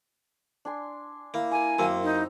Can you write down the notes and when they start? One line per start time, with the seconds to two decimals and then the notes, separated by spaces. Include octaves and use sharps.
0.65 D4 G#5 C6
1.34 A#3 E4
1.52 A#4 G#5 D6
1.79 F#2 A#3 C4 E6
2.04 D#4